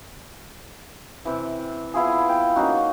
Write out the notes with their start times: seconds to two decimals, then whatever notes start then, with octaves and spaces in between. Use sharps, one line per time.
1.25 C3 E3
1.94 B3 E4 F4 G#4
2.29 G5
2.56 A#3 C#4 D#4 F#4